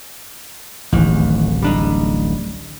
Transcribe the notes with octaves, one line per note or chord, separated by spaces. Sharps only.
D1 A1 D#2 E3
G3 D4 D#4